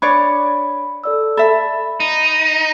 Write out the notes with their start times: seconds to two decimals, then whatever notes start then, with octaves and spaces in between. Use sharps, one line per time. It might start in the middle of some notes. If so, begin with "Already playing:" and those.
0.02 D4 C#5 D5 B5
1.04 A4 D5 E6
1.37 A4 E5 B5
2.00 D#4